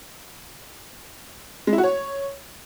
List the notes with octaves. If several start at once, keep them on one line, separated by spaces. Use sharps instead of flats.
G#3
E4
F#4
C#5